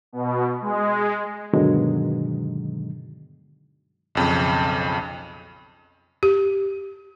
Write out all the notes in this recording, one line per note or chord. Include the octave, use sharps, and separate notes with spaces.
B2
G#3
G2 B2 D3 D#3 F#3 G#3
B1 F2 C#3
G4